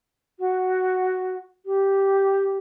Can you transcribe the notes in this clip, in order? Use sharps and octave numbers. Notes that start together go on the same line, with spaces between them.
F#4
G4